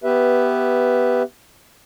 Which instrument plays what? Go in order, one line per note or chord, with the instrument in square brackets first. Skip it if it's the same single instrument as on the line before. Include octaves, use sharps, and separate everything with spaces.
[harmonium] B3 G4 B4 E5